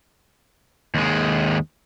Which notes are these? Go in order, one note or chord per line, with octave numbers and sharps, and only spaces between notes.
D#2 G#3